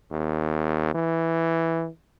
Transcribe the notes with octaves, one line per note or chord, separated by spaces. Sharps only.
D#2
E3